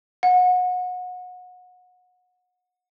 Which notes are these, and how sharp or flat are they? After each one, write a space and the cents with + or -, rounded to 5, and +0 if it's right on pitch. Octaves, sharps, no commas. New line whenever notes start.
F#5 -30